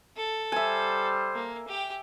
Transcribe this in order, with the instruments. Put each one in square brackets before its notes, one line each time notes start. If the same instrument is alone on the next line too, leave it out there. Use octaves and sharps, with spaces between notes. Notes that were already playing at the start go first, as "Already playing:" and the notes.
[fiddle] A4
[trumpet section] G3 C5 [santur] E5 G#5
[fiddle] A#3
G4 G5